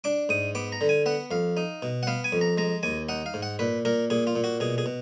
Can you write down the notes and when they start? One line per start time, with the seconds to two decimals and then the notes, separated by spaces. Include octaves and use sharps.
0.04 D4 D6
0.29 G#2 D#6
0.55 B3 D6
0.72 A#5
0.81 D3
0.89 G#5
1.06 B3 F#5
1.31 F2 F5
1.57 D#4
1.82 B2
2.03 F#5
2.07 B3 F5
2.24 G#5
2.32 F2
2.41 A#5
2.57 G#3 A#5
2.83 D#2 G#5
3.09 D#4 F#5
3.26 F5
3.34 G#2
3.43 F#5
3.59 A#2 B4
3.85 A#2 A#4
4.10 A#2 G#4
4.27 F4
4.36 A#2
4.44 F#4
4.60 B2 G#4
4.78 G#4
4.86 B2